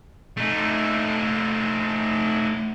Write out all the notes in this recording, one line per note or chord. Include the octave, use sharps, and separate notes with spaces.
A3 D#4